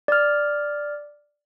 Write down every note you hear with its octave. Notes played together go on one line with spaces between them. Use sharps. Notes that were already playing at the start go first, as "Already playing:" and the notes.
D5 F6